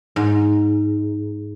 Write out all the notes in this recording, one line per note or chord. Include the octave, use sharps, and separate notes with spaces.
G#2